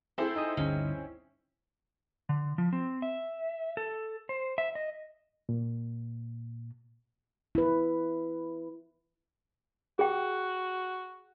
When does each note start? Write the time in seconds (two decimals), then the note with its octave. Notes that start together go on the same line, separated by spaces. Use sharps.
0.18 C4 E4 G#4 A4 C5
0.36 D#4 D#5 D#6
0.57 G1 D2 C#4
2.29 D3
2.58 F3
2.73 C4
3.02 E5
3.77 A4
4.29 C5
4.58 E5
4.75 D#5
5.49 A#2
7.55 E4 B4
9.99 F#4 G#4 G5